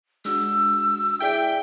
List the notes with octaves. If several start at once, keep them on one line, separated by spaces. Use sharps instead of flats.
G#3 D4 F#4 E6
E4 G#4 D5 E5 G5